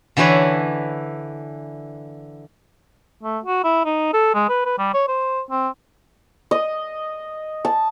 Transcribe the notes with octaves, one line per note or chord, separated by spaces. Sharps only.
D3 E3 E4 B4 C#5 D5
A3
F#4
E4
D#4
A4
G#3
B4
B4
G3
C#5
C5
C4
D#5
A5